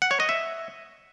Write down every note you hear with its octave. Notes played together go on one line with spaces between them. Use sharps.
F#5
C#5
D#5
E5